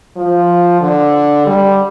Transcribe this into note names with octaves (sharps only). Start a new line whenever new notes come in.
F3
D3
G3